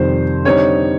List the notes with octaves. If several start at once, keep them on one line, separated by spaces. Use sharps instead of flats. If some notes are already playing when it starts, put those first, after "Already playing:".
Already playing: F2 C3 D#3 G3 C5
D3 G3 C4 D#4 C#5